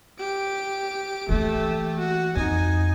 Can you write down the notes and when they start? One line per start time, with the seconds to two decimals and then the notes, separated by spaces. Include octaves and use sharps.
0.19 G4 D7
1.29 E3 A3 A#3 G4
1.99 F#4
2.36 F2 D#4 G#5